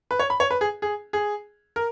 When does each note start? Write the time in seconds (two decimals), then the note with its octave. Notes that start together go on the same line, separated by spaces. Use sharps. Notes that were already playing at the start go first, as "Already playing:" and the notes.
0.11 B4
0.20 C#5
0.30 B5
0.40 C#5
0.51 B4
0.61 G#4
0.82 G#4
1.13 G#4
1.76 A#4